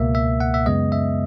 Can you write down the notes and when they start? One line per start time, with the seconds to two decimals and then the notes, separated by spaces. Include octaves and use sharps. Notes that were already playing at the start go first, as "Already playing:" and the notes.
Already playing: C#2 B2 A#3 E5
0.15 E5
0.40 F#5
0.54 E5
0.66 F#2 C#3 G#3 B3 D#5
0.92 E5